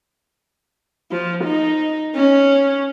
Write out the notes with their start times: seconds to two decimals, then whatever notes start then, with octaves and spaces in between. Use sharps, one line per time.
1.12 F3
1.44 D#4
2.15 C#4